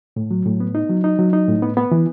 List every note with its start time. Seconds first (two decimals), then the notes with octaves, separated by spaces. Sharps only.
0.16 A2
0.31 F#3
0.46 A2
0.60 B3
0.75 D#4
0.89 F#3
1.04 D#4
1.19 F#3
1.33 D#4
1.48 A2
1.62 B3
1.77 B3
1.91 E3